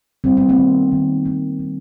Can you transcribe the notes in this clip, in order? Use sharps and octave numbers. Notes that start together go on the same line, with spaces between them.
G3 C4
B3
A#3 C4
D#3
D#3
A#3
G3